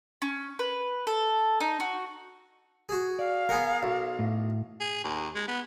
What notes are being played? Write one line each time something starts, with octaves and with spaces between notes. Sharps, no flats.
C#4
B4
A4
D#4
F#4
F#4 G#4
D5 F5
B3 G#4 A#4 F#5
B1
A2
G#4
D#2
G#3
B3